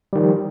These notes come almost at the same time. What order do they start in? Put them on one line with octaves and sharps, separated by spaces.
G3 D#3 F3